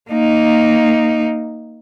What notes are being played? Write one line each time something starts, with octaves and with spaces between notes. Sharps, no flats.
A#3 D#4